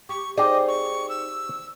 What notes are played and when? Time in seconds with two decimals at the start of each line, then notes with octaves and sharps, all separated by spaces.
0.09 G4 C#6
0.38 C4 D#4 G4 G#4 D5 D#5
0.68 C#6
1.09 E6